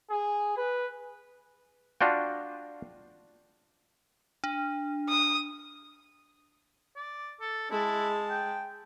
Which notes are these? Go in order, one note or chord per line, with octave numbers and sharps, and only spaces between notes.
G#4
B4
D4 F4 F#4 G5
D4
D#6
D5
A4
G#3 E4 A5
G5